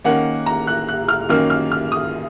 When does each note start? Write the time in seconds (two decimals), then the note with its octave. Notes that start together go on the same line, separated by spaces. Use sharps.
0.04 D#3 A#3 C#4 F#5
0.46 A#5
0.67 F#6
0.89 F#6
1.08 F6
1.29 F#2 D#3 A#3 C#4 F6
1.50 F6
1.72 F6
1.92 D#6